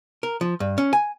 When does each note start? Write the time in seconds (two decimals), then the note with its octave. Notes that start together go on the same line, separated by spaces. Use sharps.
0.23 A#4
0.41 F3
0.60 G2
0.78 C#4
0.93 G#5